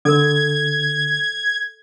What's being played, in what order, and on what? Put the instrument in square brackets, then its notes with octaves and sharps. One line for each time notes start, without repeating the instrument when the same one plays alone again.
[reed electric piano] D3 [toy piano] A4 A#4 [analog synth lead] G#6